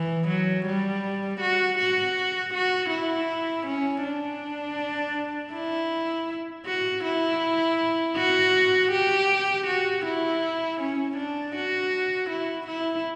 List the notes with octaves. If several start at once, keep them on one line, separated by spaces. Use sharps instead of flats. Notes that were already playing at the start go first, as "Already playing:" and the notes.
Already playing: E3
F#3
G3
F#4
F#4
F#4
E4
C#4
D4
E4
F#4
E4
F#4
G4
F#4
E4
C#4
D4
F#4
E4
E4